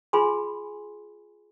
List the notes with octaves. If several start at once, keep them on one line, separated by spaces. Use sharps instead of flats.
F4 G#4 G#5 B5 C6